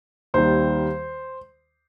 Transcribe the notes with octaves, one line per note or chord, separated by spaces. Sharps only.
D#2 D#3 G3 C5